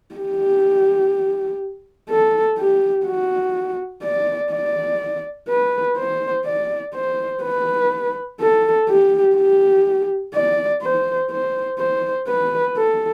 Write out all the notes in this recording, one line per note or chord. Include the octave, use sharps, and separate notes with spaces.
G4
A4
G4
F#4
D5
D5
B4
C5
D5
C5
B4
A4
G4
G4
D5
C5
C5
C5
B4
A4